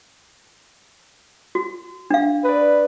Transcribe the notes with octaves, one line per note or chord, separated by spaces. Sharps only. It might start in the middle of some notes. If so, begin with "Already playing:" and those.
F#4
D4 F5
B4 D5 D#5